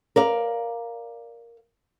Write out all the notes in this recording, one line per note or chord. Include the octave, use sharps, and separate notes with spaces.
A#4 D5 F5